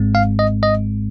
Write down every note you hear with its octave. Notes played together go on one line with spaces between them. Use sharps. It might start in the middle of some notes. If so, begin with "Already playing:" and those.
Already playing: G#1 G#2 G#3 C4
F5
D#5
D#5